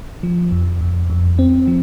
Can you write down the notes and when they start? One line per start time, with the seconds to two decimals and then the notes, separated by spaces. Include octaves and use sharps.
0.23 F3
0.52 F2
0.81 F2
1.10 F2
1.39 C4
1.68 F3